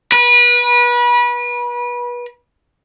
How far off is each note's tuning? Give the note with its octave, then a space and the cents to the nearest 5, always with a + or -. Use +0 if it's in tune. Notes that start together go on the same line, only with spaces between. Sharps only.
B4 -30